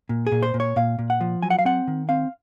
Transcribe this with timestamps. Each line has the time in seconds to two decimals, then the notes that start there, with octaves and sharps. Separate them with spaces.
0.09 A#2
0.27 G#4
0.32 A#2
0.43 C5
0.54 A#2
0.60 C#5
0.76 A#2 F5
0.99 A#2
1.10 F#5
1.21 F3
1.42 F#3 G#5
1.50 F#5
1.59 F5
1.65 C4 F#5
1.88 D#3
2.09 C4 F5